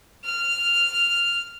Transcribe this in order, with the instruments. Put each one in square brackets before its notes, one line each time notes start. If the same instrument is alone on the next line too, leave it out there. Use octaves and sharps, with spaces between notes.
[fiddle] F6